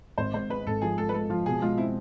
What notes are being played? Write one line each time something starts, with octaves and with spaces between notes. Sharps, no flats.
G#1 C5
G#2 C5
G#3 B4
G#1 A4
F3 G#4
G#3 A4
B4
G#3 A4
F3 F4
B2 G#4
G#3 F4
C4 E4